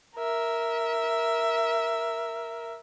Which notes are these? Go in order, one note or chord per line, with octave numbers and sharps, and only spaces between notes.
A#4 E5